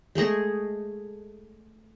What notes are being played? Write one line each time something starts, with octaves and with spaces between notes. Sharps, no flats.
G#3 A3 G#4 D#5